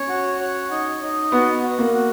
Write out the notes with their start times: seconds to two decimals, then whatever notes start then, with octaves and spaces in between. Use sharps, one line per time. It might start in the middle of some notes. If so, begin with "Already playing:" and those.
Already playing: C#4 C#5
0.08 F#4
0.40 C#5
0.71 D#4
1.01 D#4
1.32 B3 F#4
1.63 F#4
1.79 A#3
1.94 F#4